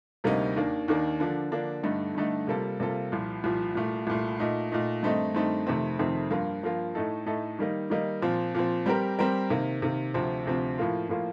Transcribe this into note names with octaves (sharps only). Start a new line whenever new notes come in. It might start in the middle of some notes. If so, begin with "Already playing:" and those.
D2 C3 G3 A#3 D#4
D#2 D#3 A#3 D4
D#2 D#3 A#3 D4
D3 F3 A#3 D4
D3 F3 A#3 D4
G2 D3 A3 D#4 A4
G2 D3 A3 D#4 A4
C3 G3 A#3 F4 A4
C3 G3 A#3 F4 A4
C2 A#2 F3
C2 A#2 F3
C2 A#2 A3
C2 A#2 A3
A#2 A3 D#4
A#2 A3 D#4
G2 D#3 A3 C4 D#4
G2 D#3 A3 C4 D#4
F2 C3 D#3 A3 C4
F2 C3 D#3 A3 C4
G2 F3 A#3 F4
G2 F3 A#3 F4
A2 A3 D#4 A4
A2 A3 D#4 A4
D#3 G3 A#3 D#4
D#3 G3 A#3 D#4
A#2 F3 C4
A#2 F3 C4
G3 C4 G4 A#4
G3 C4 G4 A#4
C3 D#3 A#3
C3 D#3 A#3
D2 C3 F3 C4
D2 C3 F3 C4
A2 F3 A#3 F4
A2 F3 A#3 F4